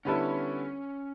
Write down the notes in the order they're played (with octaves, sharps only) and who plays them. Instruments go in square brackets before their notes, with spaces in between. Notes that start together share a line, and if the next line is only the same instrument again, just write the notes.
[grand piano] D3 G3 B3 E4 A4 [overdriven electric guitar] C#4